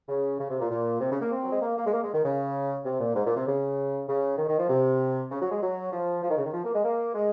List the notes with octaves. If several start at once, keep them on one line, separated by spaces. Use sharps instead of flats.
C#3
C#3
C3
A#2
A#2
C3
C#3
A#3
C4
F#3
G#3
A#3
A#3
G#3
A#3
G#3
D#3
C#3
C3
A#2
G#2
A#2
C3
C#3
C#3
D#3
D#3
F3
C3
C#3
F#3
G#3
F#3
F3
F3
D#3
C#3
D#3
F3
A#3
G#3
A#3
G#3